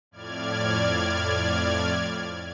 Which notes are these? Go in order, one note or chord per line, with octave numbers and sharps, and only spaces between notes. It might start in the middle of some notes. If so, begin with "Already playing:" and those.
F2 A2 D5 F6 G#6